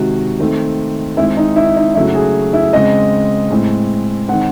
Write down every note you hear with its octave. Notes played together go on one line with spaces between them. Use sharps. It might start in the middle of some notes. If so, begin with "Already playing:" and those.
Already playing: C3 D#3 G#3 F#4
D#3 A3 C4
D#3 G#3 C4 E4
D#4
E4
D#4
C#3 F#3 A3 E4
F#4
G#4
E4
C#3 G#3 C4 D#5
A2 G#3 C4
D#3 G#3 C4 F#5